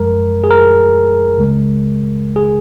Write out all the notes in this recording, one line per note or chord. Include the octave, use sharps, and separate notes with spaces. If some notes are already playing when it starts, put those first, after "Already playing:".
Already playing: F#2 F3 G#3 A#4
G#4
A#4
C#2 C#3 G#3
G#4